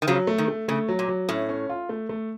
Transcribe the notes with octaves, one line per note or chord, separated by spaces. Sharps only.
D#3
C#3 F3 F#3
A3
D#3
A3
C#3 A3
F#3
A#2
F#3
A2 C#4
C#4
F4
A3
A3